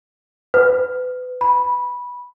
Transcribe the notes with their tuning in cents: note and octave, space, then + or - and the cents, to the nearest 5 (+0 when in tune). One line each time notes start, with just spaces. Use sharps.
B4 +30
B5 -10